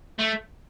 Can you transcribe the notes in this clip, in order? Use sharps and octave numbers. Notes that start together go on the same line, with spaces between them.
A3